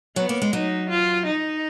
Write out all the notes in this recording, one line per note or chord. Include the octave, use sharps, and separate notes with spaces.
F#3 B3
A#3
G#3
F#3 D#4
F4
D#4